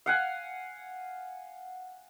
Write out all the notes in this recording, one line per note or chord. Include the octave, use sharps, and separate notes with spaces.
F5 F#5 G#5